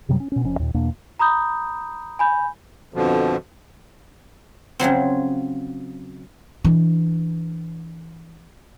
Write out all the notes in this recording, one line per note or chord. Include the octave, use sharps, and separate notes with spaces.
F#2 C3 F#3 G3
C#4
B2 C#4
F1 F2 C#4
D#2 A#2
E2 B2 A#3 D4
A#5 B5 D#6 G6
G#5 B5 G6
F2 B2 D3 F3
C#3 F3 F#3 C4
E3 D4